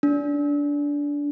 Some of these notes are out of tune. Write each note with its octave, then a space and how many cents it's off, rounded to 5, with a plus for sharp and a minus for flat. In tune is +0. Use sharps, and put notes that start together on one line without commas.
D4 -20